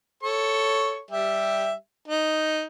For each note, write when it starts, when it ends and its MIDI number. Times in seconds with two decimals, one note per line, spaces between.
0.23 1.01 69
0.23 1.01 73
0.23 1.01 85
1.11 1.72 55
1.11 1.72 67
1.11 1.72 76
2.08 2.63 63